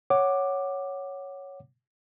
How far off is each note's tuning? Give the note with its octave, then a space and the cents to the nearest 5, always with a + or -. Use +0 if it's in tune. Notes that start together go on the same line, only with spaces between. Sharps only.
C#5 +0 F#5 +5 D6 +10